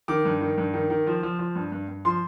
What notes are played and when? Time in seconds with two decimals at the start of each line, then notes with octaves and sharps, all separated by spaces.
0.08 D#3 D6
0.25 G2
0.41 D#3
0.58 G2
0.74 D#3
0.90 D#3
1.07 F3
1.23 F3
1.39 F3
1.55 G2
1.72 G2
1.88 G2
2.05 F3 C6